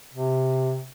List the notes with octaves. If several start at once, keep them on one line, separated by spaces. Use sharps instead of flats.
C3